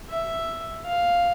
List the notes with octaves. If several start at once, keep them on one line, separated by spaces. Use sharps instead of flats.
E5
F5